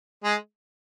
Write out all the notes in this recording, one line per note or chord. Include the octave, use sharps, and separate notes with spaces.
G#3